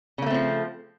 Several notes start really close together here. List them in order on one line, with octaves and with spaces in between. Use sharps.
C#3 A#3 A3 C4 F3